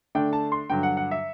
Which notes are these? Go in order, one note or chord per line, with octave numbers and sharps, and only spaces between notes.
D3 A3 D4 G5
A5
C6
G2 D3 F#3 G5
F#5
F#5
E5